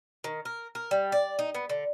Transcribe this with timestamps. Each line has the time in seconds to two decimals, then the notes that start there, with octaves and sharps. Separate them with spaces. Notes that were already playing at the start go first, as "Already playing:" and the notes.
0.24 D#3
0.45 A#4
0.75 A#4
0.91 G3
1.12 D5
1.39 D#4
1.55 B3
1.70 D3